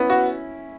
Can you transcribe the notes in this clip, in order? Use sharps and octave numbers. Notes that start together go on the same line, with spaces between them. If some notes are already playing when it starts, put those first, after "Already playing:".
Already playing: B3 C#4 E4
F#4